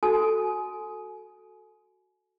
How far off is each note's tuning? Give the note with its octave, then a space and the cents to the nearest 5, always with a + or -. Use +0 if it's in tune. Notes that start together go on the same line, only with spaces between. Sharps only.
F#4 +0 A4 +0 G#5 +25